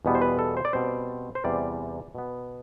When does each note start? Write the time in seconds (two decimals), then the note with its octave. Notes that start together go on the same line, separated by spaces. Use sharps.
0.05 E2 B2 G3 B3
0.15 C5
0.22 B4
0.39 A4
0.57 C5
0.65 D5
0.73 B2 G3 C4 C5
1.35 C5
1.44 E2 C3 E3 G3 D5
2.15 B2 B3